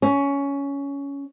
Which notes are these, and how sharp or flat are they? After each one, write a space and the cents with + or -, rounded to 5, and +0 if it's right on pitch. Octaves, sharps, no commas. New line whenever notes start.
C#4 +15